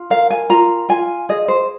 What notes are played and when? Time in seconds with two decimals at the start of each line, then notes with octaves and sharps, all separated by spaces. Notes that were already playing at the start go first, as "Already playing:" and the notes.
Already playing: F4
0.10 A#4 F5
0.30 G#5
0.50 F4 A#5
0.89 F4 G#5
1.29 G#4 D#5
1.48 C5